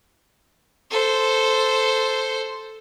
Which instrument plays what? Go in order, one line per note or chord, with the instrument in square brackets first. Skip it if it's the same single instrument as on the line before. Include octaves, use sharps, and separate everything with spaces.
[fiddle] A4 C5